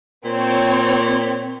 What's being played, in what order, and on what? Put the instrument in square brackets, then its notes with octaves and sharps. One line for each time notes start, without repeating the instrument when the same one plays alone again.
[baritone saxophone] A#2 [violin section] C4 C#5